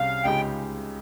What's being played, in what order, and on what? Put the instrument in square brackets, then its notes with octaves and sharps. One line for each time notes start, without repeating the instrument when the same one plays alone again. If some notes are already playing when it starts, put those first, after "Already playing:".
Already playing: [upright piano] C2 C3 G3 C#4 G#4 [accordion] F5
[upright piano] C#2 C#3 G#3 D#4 G4 [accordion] G5